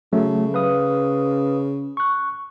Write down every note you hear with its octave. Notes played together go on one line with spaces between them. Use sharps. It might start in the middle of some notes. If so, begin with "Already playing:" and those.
C#3 F#3 A3
B4 F5 D#6
C#6 F#6